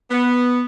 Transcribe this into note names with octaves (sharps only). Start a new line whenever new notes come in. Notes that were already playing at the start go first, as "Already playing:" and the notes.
B3